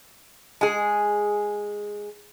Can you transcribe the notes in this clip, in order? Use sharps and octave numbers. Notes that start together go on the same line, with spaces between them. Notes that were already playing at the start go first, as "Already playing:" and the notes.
G#3 G#4